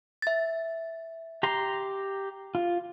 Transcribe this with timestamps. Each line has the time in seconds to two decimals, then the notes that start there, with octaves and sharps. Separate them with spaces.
0.22 E5 A6
1.43 G4 A#5 C6
2.55 F4